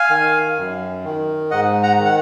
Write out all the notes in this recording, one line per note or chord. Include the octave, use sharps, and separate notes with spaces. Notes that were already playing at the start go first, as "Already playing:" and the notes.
Already playing: F5 G#5
D#3
F#2
D#3
G#2 D#5 F#5
F#5 A#5
D#3
F#5